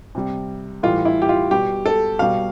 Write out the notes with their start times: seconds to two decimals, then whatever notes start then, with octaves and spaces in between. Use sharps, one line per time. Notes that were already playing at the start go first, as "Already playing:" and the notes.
0.15 C3 G3
0.83 A2 E3 G3 F4
1.05 E4
1.22 G4
1.29 F4
1.51 B2 G3 G4
1.86 A4
2.19 B2 G3 F5